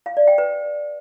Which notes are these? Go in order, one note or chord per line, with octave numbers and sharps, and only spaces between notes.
F5
D5
G5
B4